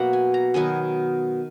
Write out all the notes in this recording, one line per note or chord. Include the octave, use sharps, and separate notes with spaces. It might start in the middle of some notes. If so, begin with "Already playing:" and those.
Already playing: B2 F#3 A#3 E5 F#5
G#5
A#5
D#3 F#3 B3 G#5